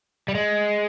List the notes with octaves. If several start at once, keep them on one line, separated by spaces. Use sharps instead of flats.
G3
G#3